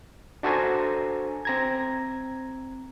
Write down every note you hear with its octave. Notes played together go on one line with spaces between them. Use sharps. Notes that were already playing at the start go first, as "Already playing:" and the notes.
D4 F#4 A4 C5 G#5 A#5
C4 A#5 G#6